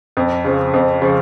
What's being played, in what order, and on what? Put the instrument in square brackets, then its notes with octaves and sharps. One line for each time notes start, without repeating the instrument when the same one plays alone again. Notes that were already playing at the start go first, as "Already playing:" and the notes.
[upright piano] F2
C#3 F3
F2
C#3 F3